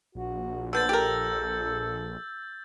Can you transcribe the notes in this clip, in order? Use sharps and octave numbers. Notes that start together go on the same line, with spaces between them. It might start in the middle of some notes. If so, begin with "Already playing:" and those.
A#1 F#4
D3 B3 E6 G6 A6
G4 A4 A#4